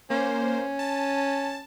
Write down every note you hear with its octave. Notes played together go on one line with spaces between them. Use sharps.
A#3 C#4 C5
A5